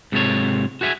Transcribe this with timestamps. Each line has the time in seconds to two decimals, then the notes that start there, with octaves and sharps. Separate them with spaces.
0.12 G#2 C3 G#3 F4 A4 C#5
0.81 F#4 G#4 E5 F5 G#5